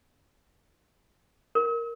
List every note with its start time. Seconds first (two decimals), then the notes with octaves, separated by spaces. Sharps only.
1.55 A#4